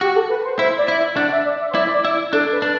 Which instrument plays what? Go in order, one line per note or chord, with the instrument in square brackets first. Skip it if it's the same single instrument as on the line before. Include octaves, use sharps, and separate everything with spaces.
[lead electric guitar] F#4 [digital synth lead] G4
[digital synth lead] A4
B4
C5
[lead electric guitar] E4 [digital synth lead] C5
[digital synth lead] D5
[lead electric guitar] E4
[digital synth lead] E5
[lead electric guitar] D4 [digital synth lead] F#5
[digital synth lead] E5
D5
E5
C5
[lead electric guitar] E4 [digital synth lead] D5
[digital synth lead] D5
[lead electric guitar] E4
[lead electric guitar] D4 [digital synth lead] A4
[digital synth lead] B4
[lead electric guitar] D4